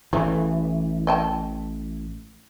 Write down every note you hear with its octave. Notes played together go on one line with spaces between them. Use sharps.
A1 C#3 E3 A3
D#5 G5 A5